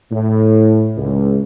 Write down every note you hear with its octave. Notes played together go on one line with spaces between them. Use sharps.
A2
C#2